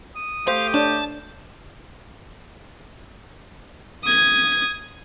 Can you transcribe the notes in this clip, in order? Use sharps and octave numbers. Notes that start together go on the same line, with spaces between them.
D#6
A3 G4 C5 F5
D4 C#5 A5
D#6 G#6